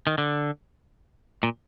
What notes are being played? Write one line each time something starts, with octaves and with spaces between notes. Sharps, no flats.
D#3
D3
A#2